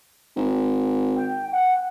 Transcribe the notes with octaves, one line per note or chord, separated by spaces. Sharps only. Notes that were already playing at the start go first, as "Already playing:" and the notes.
G#1
G5
F#5